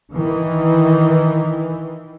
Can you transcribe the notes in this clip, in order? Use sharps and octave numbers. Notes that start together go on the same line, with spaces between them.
D#3 E3